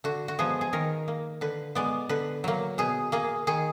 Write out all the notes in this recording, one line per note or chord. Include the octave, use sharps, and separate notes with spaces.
D3 F#4
F#4
F3 G#3 B3 G#4
G#4
D#3 A#4
A#3
D3 B4
G#3 B3 D5
D3 B4
F#3 A#3
B2 G#4
A#3 G#4
D#3 G#4